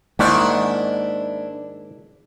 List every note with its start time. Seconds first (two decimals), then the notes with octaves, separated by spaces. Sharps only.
0.19 G#2 D#3 G#3 A#3 D4 E4 D5 F#5